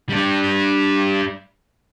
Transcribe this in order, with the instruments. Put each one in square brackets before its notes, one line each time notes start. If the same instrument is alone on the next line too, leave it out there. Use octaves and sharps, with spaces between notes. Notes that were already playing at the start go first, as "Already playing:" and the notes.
[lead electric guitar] G3 D4